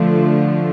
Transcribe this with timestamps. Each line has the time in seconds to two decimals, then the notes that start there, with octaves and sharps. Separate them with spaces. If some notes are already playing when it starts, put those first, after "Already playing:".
Already playing: D3 F3 A3